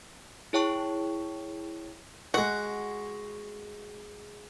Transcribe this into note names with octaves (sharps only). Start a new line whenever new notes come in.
E4 G#4 C#5 G5 A5 C#6
G#3 F#4 F#5